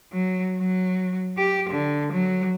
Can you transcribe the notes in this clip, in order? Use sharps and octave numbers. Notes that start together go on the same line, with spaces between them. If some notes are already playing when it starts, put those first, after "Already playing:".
F#3
F#3
G4
D3
F#3